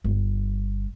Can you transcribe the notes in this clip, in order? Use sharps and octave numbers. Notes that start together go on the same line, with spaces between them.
G1